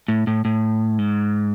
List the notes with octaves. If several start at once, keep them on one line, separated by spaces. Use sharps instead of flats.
A2
A2
A2
G#2